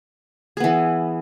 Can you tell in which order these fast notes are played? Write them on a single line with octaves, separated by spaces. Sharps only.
G#4 B3 E3